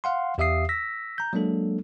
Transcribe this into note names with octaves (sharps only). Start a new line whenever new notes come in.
F5 F#5 C6
E2 G4 E5 F5 D#6 C7
E6 A#6 B6
A#5 G6
F#3 G#3 A#3 D4 A4